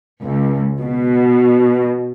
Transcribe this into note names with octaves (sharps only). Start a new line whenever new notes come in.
C#2
B2